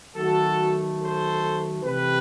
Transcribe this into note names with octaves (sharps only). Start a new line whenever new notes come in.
D#3 F#3 A3 F#4 A4
A4 C5
C3 E3 A3 G4 B4